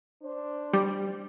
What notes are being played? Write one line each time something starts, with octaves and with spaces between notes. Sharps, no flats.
D4 C5
G3